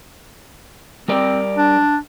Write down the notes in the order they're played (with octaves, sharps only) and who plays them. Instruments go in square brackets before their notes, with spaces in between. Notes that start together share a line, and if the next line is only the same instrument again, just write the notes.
[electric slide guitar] G3 A#4 D5 [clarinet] C4
[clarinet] D4